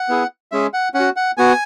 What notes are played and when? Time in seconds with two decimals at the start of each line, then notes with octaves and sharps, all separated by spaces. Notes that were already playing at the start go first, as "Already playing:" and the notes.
Already playing: F#5
0.09 B3 E4 G#4
0.52 G#3 C#4 G#4 E5
0.74 F#5
0.94 C#4 F#5
1.00 F#4
1.16 F#5
1.37 B3 F#4 G#5